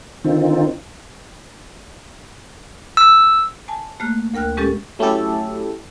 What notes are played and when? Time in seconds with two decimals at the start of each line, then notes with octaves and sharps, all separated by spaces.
0.24 D3 D#3 C4 D#4 F4
2.97 E6
3.68 G#5 A5
4.00 A3 A#3 F6 F#6
4.34 D2 A#4 G5 F6 F#6
4.57 A#2 G#3 C#4 G4 A4 A6
4.99 F#3 A3 C#4 E4 G4 A4